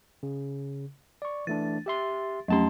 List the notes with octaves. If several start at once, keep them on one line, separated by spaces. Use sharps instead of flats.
C#3
D5 C#6
E3 A3 D4 A6
G4 E5 C6
F2 F#3 A3 C#4 A5 C6